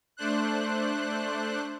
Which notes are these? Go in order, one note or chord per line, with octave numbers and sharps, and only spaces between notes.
A3 D4 C5 F#6